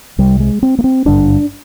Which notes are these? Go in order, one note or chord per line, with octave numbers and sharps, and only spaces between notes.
C2 C3 G3
G#3
C4
A#3
C4
G#1 G2 D3 D4